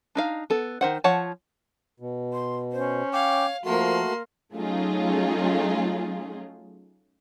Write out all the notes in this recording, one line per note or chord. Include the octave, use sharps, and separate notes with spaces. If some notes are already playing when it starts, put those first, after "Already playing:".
D4 D#4 F5
B3 A4
D#3 C5 F#5
F3 C#5 F#5 A5
B2
C6
C#4 C5
C#5 F5 G5 D6
F3 A3 A#3 F#4 A#4 C6
F#3 A3 C#4 D#4 F4 G#4